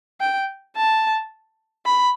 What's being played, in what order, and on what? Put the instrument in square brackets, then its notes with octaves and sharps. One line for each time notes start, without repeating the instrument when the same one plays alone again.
[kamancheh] G5
A5
B5